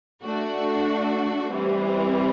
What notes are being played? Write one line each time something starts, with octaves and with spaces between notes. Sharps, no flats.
A3 D4 F#4
E3 G3 C4